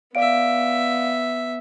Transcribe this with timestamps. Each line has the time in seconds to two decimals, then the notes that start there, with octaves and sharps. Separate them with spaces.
0.15 B3 D5 E5 F5 D7